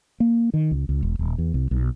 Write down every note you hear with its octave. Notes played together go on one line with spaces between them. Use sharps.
A#3
D#3
C#2
C#2
E1
D#1
E2
C2
B1